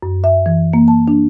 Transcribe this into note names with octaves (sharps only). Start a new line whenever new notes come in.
F#2
E5
E3
A#3
A5
D4